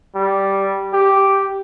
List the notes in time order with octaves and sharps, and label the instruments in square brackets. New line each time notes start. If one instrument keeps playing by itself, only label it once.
[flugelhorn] G3
G4